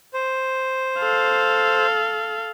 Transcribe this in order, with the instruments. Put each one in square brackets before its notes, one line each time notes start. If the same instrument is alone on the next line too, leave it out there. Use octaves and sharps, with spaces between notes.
[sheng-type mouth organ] C5
[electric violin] A4 F5